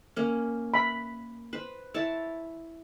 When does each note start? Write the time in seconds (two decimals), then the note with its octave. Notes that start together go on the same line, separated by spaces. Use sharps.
0.16 A#3 C#4
0.74 B5
1.53 B4 C5
1.94 E4 C#5 A5